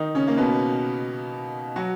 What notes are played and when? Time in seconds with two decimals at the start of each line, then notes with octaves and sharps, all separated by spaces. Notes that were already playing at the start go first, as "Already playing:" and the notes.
Already playing: D#3 D#4
0.14 C#3 C#4
0.27 A#3
0.37 B2 B3
1.76 F#3 F#4